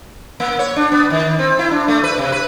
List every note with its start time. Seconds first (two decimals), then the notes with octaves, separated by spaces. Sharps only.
0.40 A#3
0.59 C#5
0.76 D4
0.92 B3
1.10 D#3
1.39 C4
1.59 E4
1.71 D4
1.88 A3
2.03 B4
2.18 C3
2.32 B4